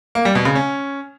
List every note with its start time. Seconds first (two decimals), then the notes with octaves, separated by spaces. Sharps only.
0.15 A#3
0.25 G3
0.35 B2
0.45 C#3
0.55 C#4